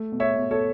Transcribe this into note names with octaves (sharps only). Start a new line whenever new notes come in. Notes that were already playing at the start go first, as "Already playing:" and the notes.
Already playing: A3
B2
C#5 E5
B2
A4 C#5